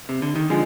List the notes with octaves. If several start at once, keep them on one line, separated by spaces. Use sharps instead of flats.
C3
D3
D#3
D3 F3 G#3